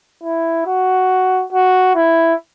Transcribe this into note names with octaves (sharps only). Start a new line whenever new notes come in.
E4
F#4
F#4
E4